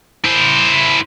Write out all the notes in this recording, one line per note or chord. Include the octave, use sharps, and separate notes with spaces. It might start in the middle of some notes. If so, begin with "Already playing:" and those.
E4 C5